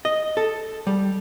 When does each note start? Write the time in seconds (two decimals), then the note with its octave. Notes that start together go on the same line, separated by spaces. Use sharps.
0.05 D#5
0.37 A4
0.87 G3